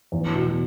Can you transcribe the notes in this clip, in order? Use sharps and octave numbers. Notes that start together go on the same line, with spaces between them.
E2
B2